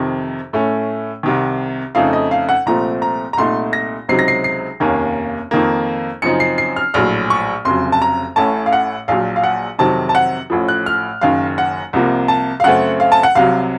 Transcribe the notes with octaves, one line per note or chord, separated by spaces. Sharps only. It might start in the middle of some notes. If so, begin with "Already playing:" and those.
Already playing: F2 C3 D#3
A2 A3 C#4
C2 C3 D#3
F2 C#3 A3 D#4 F5
D#5
F5
F#5
C2 A#2 F3 A3 C4 A#5
A#5
A#5
C2 A#2 A3 D#4 C6
A#6
C#2 C3 F#3 C4 D#4 C7
A#6
C7
C7
F1 D#2 D#3 A#3 C#4
F2 D#3 A#3
F#2 C#3 F3 C4 D#4 C#7
C7
C7
F6
A#1 A2 F#3 F6
C#6
F1 F2 C#3 F#3 C6
A5
A#5
A1 A2 A3 C#4 A5
F5
F#5
A#1 A#2 F#3 F5
F5
F#5
F2 C3 D#3 F#3 C4 A5
A5
F#5
A1 A2 F3
F#6
F6
F#1 F#2 D#3 F5
F#5
C2 C3 F3 A#3
A5
F5
F#2 C#3 A3 C4 F#5
F5
A5
F#5
C2 C3 F#3 F5